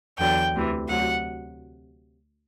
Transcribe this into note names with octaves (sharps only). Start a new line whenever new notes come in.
E2 D3 F#3 G5
D2 C3 E3
D2 C3 F#3 F#5